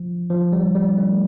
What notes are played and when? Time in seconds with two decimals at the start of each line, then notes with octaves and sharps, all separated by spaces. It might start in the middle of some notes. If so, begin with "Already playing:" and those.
Already playing: F3
0.30 F3
0.53 G3
0.75 G3
0.97 A3